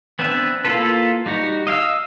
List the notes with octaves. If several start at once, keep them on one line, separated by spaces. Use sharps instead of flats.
B3 C4 D4 B4 E5
A#3 E4 F4 A4 B4
G3 D#4 F#4
D#5 F5 G5 E6